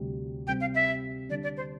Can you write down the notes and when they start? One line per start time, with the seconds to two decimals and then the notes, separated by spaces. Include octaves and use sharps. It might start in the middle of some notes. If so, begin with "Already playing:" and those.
Already playing: D2 C3 G3
0.47 C3 G3 C4 G4 G5
0.61 F5
0.75 E5
1.29 D3 G3 D4 D5
1.43 D5
1.57 C5